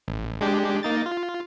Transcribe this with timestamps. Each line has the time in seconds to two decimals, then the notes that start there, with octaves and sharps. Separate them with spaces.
0.08 A1
0.41 G#3 D4 G4
0.83 A#3 D#4 A6
1.06 F4